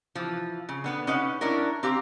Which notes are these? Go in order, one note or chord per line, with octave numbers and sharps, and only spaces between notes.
E3 F3
C#3
D3 B3 B4
C#4 D#4 B4 F#5
C#4 D4 E4 A#4
C4 G4 F5 A#5